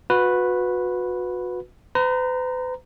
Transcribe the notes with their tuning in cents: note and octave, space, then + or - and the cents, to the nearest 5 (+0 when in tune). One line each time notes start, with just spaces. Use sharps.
F#4 -30 B4 +0
B4 +45 A#5 +0